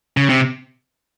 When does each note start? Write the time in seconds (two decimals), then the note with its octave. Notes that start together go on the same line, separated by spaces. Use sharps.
0.17 C#3
0.29 C3